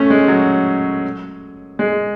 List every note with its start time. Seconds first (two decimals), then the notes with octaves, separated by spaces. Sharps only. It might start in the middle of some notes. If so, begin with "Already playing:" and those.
Already playing: A3 C#4
0.10 G#3
0.28 F#3
1.79 G#3